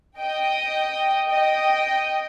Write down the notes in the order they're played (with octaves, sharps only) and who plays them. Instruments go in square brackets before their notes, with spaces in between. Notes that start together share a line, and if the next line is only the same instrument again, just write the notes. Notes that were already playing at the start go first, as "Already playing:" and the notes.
[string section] D#5 G5
D#5 G5